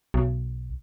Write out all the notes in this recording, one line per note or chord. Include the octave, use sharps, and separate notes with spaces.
B1